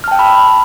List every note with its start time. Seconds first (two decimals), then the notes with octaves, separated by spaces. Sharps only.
0.04 F6
0.08 A5
0.11 G5
0.15 E6
0.19 B5